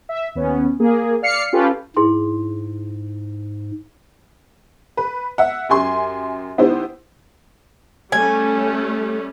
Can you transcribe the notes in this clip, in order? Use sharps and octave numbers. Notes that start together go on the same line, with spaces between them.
E5
D#2 B3 C#4
A#3 G#4
D5 F5 F6 C7 C#7
C#4 F4 G4 A4 B4
G#2 E4 G#4 C6
B4
E5 F#5
F#2 G4 G#5 C6
D#3 B3 E4 G4 C5
G3 A3 C#4 G#5